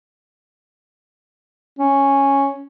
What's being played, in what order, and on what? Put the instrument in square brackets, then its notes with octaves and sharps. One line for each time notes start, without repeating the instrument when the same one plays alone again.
[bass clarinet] C#4